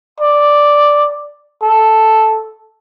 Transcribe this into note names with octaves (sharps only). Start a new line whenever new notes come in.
D5
A4